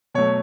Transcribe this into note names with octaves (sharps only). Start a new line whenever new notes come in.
B2 F#3 A3 C#5